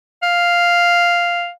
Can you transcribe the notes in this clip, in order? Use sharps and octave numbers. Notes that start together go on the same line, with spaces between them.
F5